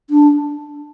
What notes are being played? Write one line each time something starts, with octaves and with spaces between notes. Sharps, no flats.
D4